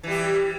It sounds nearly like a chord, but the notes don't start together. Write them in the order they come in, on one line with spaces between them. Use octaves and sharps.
E3 G3 G4